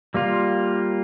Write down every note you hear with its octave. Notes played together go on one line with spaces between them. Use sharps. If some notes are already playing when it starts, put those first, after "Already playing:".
G3 A#3 F4